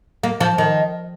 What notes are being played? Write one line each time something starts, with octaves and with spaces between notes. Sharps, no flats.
A#3
F3
D#3